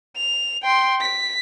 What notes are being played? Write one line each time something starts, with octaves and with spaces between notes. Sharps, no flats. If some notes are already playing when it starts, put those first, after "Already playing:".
F7
G5 C6
B6